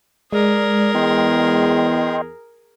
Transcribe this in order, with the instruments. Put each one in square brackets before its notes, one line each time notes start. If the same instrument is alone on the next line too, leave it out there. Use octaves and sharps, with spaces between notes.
[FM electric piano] G#3 [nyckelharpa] G#4 A#4 [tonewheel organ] D5
[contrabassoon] E2 [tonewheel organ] D#5 G5 C6